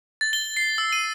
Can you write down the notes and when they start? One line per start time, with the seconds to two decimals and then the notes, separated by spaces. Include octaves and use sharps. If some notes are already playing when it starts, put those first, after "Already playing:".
0.21 A6
0.33 G7
0.57 C7
0.78 E6
0.93 D#7